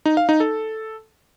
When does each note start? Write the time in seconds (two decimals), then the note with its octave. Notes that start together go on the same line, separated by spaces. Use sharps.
0.06 D#4
0.17 F5
0.29 D#4
0.40 A4